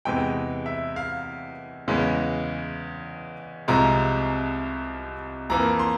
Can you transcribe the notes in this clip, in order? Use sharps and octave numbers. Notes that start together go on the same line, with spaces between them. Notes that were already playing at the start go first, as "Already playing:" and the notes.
E2 C3 E3 G#3 G5
E5
F5
E2 C#3 E3 G#3
C2 C3 F3 G#3 A#5
F2 E3 A#3 A#5
C6